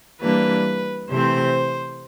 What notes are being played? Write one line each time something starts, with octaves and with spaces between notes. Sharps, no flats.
E3 G3 A#3 D4 B4
C3 E3 A3 C4 C5